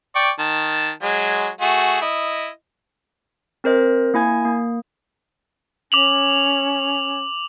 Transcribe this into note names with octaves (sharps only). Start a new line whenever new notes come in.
D5 G5 C#6
D#3 A5
F#3 G#3
A3 F#4 G#4
E4 D#5
C4 A#4 C5 D#5
A#3 E4 G#5 G#6
A#3
C#4 D6 F7 F#7